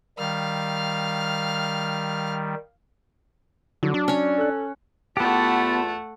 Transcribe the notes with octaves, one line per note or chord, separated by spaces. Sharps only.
D#3 G3 F5 F6
D3 F#3
D4
C#4 C#5
A4 F#6
E2 A3 B3 F4 G4 F#5 A5